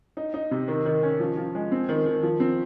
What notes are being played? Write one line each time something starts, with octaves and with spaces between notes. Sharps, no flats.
D#4
D#4
C3
D#3
D#3
C#4
F3
F3
G#3
C4
D#3
D#3
F3
C4